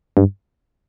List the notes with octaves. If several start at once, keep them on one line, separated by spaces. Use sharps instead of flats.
G2